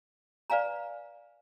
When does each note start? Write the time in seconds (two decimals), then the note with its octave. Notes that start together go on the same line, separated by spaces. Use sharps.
0.50 B4 D5 F5 G#5 A#5